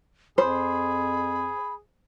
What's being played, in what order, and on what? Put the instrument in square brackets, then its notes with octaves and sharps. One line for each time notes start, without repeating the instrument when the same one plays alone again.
[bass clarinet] F2 [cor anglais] G#4 [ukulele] C5 [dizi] B5